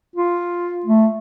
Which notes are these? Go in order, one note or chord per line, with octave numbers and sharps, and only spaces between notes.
F4
A3